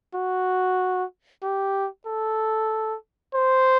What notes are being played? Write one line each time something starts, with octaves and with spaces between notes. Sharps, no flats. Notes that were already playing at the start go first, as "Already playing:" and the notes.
F#4
G4
A4
C5